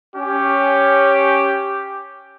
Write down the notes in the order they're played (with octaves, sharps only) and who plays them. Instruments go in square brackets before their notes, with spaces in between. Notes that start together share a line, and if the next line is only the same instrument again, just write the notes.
[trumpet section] C#4 [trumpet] G4